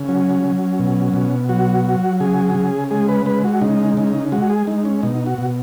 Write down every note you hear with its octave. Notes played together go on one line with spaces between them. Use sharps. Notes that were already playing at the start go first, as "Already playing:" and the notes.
Already playing: C#3
F#3 C#4
F#3
B2
B2
F#3 F#4
F#3
C#3 G#4
C#3
G#3 G#4
B4
G#3 B4
F#4
C#3 D#4
C#3
G#3 F#4
G#4
G#3 D#4
C#4
B2 D#4
F#4
B2